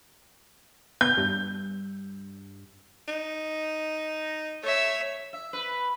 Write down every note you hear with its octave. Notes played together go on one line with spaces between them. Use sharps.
B3 G6
G2
D#4
A3 C#5 E5
E5
B4